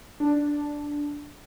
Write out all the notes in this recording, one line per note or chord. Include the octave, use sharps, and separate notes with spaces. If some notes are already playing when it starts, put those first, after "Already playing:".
D4